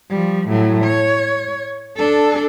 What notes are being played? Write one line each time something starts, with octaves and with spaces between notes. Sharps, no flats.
F3 G3
A2 F#3
C#5
D4 A4